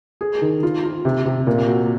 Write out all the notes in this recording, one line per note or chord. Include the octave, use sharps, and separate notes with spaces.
G#4
D#3
F4
F4
C3
C3
A#2
F#4